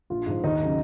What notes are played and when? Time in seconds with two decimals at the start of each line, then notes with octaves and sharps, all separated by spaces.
0.10 A#1 F4
0.26 G#2 F3
0.44 D#2 D#4
0.60 C#3 F#3